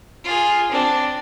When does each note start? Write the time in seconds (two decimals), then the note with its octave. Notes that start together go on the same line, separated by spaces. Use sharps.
0.24 F4 G#4
0.71 C4 D4